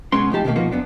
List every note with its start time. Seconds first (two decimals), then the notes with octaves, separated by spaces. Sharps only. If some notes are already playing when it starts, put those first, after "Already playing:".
0.12 B1 G#3 B3 C#4 C6
0.31 A2 F3 D#4 G4 A5
0.45 B2 D3 D#3 F#3 A3 A#3
0.56 B2 F3 A#3 B3 D#4 F#4
0.72 F#2 B3 D4